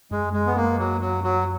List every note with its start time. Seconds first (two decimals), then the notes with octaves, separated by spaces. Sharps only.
0.11 F#2 G#3
0.33 G#3
0.46 B3
0.56 A#3
0.79 F#3
1.01 F#3
1.24 F#3